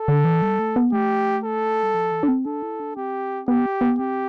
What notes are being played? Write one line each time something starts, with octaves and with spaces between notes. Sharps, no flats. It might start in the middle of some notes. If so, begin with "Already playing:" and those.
Already playing: A4
D3
E3
G3
A3
B3
A3 G4
A4
G3
F3
E3
D4
C4
D4 A4
E4
D4
C4 G4
B3 G4
B3
C4 G4